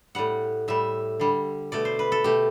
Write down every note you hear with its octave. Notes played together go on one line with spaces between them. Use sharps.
A2 G3 F#5
A2 G3 E5
D3 G3
B2 A3 D5
C5
B4
A4
B2 A3 G4